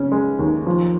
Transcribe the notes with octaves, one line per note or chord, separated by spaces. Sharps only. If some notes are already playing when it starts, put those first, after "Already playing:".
Already playing: C#3 C#4
G#3
D#2
F3